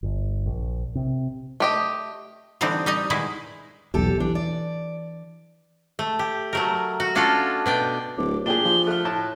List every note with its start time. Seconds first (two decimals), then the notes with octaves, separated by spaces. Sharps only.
0.03 G1
0.46 A#1
0.95 C3
1.60 A3 G4 D#5
2.61 D3 E3 G3 C4 D#4
2.86 G3 D#4 D#5
3.10 B2 D#3 G#3 E4
3.94 B1 E2 G4 A4
4.20 E3 D4
4.35 D5
5.99 A3
6.19 G4
6.53 F#3 A3 A#4
7.00 F#4
7.15 C#4 D4 F4 F#4 A4
7.66 B2 D4 G5
8.17 D1 D6
8.46 A#2 D4 G4 G#4 G7
8.65 F3
8.87 A3 F6 F#6
9.05 A2 A5